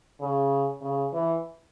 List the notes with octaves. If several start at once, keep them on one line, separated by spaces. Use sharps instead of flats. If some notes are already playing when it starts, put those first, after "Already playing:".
C#3
C#3
E3